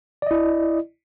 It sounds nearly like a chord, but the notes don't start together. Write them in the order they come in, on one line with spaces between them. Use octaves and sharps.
D5 D#5 E4